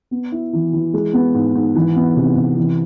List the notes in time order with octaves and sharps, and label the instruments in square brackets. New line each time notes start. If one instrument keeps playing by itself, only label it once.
[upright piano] B3
E4
E3
E3
G#3
B3
G#2
G#2
E3
B3
C3
C3
E3